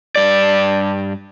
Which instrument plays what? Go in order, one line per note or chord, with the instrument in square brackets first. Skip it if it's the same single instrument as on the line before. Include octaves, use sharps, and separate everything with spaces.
[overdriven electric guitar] G2 D5